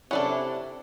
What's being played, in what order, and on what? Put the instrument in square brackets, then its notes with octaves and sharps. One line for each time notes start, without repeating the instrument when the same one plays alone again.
[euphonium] C3 [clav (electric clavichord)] C#4 [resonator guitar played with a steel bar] D4 E4 [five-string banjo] A4 D5 F#5